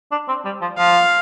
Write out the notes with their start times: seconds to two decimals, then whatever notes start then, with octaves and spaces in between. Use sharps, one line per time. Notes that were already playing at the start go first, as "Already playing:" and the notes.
0.11 D4
0.28 C4
0.45 G3
0.61 F3
0.78 F3 F5